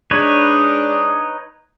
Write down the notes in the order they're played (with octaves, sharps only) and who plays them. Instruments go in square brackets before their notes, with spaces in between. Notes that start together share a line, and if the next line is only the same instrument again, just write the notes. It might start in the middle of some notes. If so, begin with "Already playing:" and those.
[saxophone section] G#3 D4 [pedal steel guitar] D#4 B4 C#5